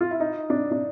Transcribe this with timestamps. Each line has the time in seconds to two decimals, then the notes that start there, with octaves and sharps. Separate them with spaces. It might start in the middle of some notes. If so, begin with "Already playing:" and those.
0.01 F4
0.11 E4
0.20 D#4
0.50 D4
0.71 D4